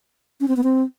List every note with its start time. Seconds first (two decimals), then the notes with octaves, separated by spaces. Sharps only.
0.40 C#4
0.48 C4
0.56 B3
0.63 C4